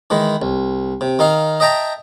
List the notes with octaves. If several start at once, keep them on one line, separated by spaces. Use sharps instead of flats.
D#3 E3 G#3
C2
C3
D#3 D#4 F5
D#5 E5 G5 A5 A#5